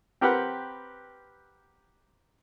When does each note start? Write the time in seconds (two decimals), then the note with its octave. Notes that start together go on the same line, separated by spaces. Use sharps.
0.21 C4 G4 A#4 B4 F#5